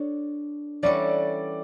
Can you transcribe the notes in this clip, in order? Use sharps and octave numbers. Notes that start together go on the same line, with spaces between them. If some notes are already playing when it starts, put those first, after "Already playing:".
Already playing: D4 A4 C#5
E3 G3 C#4 F#4 A4 D5